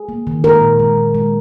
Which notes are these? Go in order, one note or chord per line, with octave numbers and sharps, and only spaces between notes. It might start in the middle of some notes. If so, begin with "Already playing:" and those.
Already playing: G#4
A#3
D#3
G#3 A#4
A#2
G#3
A#2
G#3